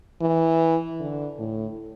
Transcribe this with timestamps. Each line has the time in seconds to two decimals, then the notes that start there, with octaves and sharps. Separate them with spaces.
0.21 E3
1.00 D3
1.39 A2